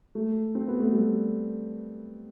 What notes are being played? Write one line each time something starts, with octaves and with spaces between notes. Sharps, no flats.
A3
C4
B3
A3
G3